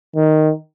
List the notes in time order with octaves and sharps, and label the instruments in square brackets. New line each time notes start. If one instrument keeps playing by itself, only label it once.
[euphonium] D#3